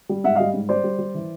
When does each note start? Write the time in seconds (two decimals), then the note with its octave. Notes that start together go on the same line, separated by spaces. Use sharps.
0.09 G3
0.24 G#2 E5 F#5
0.36 G3 D#5 F5
0.54 G#2
0.69 G3 C5 D5
0.84 G3
0.98 G3
1.14 E3